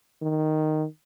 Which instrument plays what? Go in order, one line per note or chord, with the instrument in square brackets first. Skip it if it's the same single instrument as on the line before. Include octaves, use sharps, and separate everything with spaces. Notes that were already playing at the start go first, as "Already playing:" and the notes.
[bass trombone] D#3